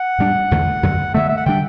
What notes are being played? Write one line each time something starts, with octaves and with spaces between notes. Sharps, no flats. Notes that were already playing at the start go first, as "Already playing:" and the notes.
Already playing: F#5
A2 G3 D4
E2 D3 A3
F#2 D3 F#3
G2 D3 A3 E5
E5
F#5
D3 G3 D4 G5